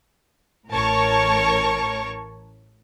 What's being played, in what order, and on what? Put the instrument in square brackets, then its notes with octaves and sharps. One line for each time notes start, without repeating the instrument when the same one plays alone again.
[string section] A1 A2 A#4 C#5 A5 C#6